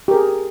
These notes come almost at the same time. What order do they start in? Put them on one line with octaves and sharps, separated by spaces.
G4 A#4 G#4